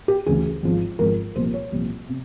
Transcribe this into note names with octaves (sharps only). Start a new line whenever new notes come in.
G4
D2 C#3 E3 G#4
G#1 G#2 F3
G#1 G#2 F3 A#4
C2 A#2 F3 C5
C#5
C2 A#2 F3
C3